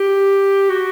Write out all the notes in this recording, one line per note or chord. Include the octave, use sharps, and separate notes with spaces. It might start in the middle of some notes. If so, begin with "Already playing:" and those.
Already playing: G4
F#4